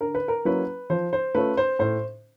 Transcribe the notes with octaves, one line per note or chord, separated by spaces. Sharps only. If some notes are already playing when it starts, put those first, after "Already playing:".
D3 A#4
B4
A#4
F#3 A#3 C#4 E4 B4
F3 C5
C5
A3 C#4 F4 B4
C5
A2 C5